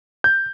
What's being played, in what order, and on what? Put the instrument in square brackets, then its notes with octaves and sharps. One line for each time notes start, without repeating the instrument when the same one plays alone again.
[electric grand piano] G6